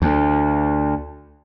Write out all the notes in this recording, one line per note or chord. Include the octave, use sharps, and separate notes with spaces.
D2